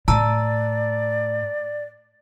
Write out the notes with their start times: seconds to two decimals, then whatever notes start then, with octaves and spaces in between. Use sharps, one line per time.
0.08 A2 D5 A5 A#5 E6